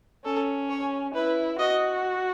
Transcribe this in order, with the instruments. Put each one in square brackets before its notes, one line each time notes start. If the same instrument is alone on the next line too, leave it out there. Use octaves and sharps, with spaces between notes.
[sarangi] C#4 [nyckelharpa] A4
[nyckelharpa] C#5
[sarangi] E4 [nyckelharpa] B4
[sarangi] F#4 [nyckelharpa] D#5